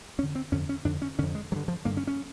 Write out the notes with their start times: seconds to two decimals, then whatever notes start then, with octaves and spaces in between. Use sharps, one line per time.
0.18 F2 C#4
0.23 D3
0.35 C4
0.52 F2 D3 C#4
0.69 C#4
0.85 F2 D3 D4
1.02 C#4
1.19 D3 C#4
1.22 F2
1.35 G#3
1.52 G2 D3 F#3
1.68 F3
1.85 G2 D3 A#3
1.97 C#4
2.07 C#4